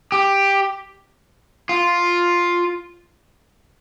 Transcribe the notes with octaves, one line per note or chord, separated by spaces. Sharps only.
G4
F4